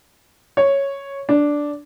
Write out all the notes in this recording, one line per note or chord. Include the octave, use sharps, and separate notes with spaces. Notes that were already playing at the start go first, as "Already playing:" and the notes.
C#5
D4